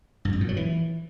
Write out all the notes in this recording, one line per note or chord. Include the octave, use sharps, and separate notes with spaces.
G2
F2
A#2
F#3
E3